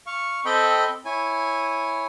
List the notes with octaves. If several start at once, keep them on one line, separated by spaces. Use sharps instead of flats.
F5 C#6
C4 A4 D#5 G5 B5
E4 C#5 G#5